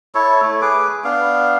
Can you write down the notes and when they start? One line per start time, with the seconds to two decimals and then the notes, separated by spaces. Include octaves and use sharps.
0.15 E4 A4 C#5
0.42 A3
0.62 G#4 B4 D6
1.04 B3 D4 F5